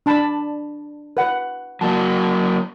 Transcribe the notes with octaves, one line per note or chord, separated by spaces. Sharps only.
D4 A5 B5
B4 F#5
F#3 A#3 F#4 A5